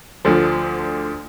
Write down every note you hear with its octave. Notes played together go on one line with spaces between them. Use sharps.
D2 D3 F3